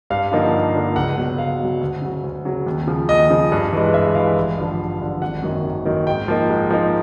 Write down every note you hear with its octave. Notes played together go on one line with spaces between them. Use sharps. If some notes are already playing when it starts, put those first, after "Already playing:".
G2 F5
D3 F3 A#3 D#4
G2
D3 F3 A#3 D#4
C#2 F#5
B2 F#3
C#2 F5
B2 F#3
D2
C#3 F#3
D2
C#3 F#3
D#2
C#3 F3
D#2 D#5
C#3 F3
G2
E3 G#3
G2 E5
E3 G#3 F5
A1
G2 D3 F3
A1
G2 D3 F3
G#1 F#5
F#2 D#3 F#3 A#3
G#1
F#2 D#3 F#3 A#3
G#2 G5
F3 A#3 D#4
G#2
F3 A#3 D#4